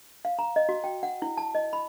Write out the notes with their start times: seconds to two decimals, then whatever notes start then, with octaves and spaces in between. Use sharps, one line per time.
0.25 F5
0.39 A#5
0.56 D#5
0.69 F#4
0.84 G5
1.03 F#5
1.22 E4
1.37 A5
1.55 D#5
1.73 B5